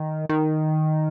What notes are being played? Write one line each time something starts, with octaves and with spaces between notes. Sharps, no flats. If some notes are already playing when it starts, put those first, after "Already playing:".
Already playing: D#3
D#3